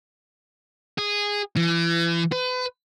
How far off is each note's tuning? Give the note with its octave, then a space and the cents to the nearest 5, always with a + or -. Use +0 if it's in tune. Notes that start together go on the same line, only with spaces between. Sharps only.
G#4 -10
E3 +35
B4 +35